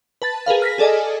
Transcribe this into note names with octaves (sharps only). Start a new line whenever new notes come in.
B4 A5 A6
G#4 A#4 B4 F5
F6 A#6 B6
G#4 A4 D5 D#5 G#5